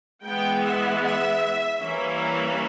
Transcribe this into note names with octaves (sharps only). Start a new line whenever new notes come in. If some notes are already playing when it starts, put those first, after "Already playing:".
E3 G#3 B3 G5
E5
E5
E3 G3 A#3 C#4 E5